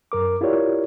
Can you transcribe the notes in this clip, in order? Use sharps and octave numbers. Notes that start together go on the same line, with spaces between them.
F#2 A#4 D6
E4 F4 G4 A#4 C#5 D5